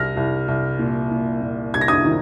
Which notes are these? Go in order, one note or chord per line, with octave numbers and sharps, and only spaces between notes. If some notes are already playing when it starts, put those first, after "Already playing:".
Already playing: C2 F6 A#6
C2
C2
A#2
A#2
A#2
C2 G#6
A#6
D#6 G#6
D#3